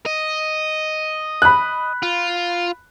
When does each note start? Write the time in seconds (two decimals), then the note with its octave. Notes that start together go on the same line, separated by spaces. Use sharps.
0.06 D#5
1.42 B5 F#6
2.03 F4